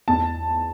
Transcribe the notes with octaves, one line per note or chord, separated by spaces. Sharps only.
E2 A5